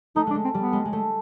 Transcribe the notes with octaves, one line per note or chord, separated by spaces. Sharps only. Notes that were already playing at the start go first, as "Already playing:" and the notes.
A3 D#4
G#3 D4
A3
C4
G3 B3
G#3
G#3
A3